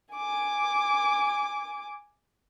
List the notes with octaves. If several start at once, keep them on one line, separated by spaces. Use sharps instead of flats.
G#5 D6